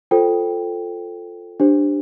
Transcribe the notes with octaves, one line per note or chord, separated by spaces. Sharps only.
F4 A4 C5 G5
D4 G4 C5